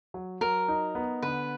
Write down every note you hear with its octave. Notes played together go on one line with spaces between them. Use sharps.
F#3
F#3 A#4
D#4
B3
D3 B4